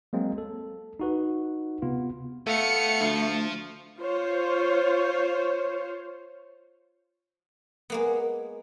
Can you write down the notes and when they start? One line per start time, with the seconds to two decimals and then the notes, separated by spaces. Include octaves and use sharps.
0.13 F#3 G#3 A#3 C4
0.38 A4
1.00 D#4 F#4 B4
1.82 C3 B3 F4
2.47 A3 B3 F5 C#7
3.01 D2 F3 F4
3.99 F4 C5 C#5
7.90 G#3 A#3 B3